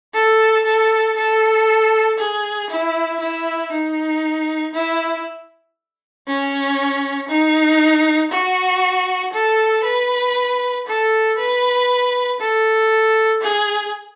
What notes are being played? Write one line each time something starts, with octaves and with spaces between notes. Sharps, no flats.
A4
A4
A4
G#4
E4
E4
D#4
E4
C#4
D#4
F#4
A4
B4
A4
B4
A4
G#4